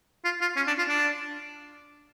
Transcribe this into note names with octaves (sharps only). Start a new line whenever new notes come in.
F4
F4
C#4
D4
F4
D4